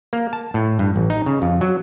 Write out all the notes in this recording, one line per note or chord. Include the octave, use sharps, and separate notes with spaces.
A#3
A5
A2
G2
A1
D#4
C#3
F2
F#3